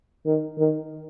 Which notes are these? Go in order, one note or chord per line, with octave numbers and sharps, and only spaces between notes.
D#3
D#3